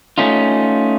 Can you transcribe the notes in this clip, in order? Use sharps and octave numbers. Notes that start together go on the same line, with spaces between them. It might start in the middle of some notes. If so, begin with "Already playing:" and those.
A3 C#4 D#4 F4